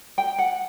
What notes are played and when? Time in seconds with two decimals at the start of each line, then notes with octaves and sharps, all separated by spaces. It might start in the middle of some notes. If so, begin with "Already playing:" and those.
0.18 G5
0.38 F#5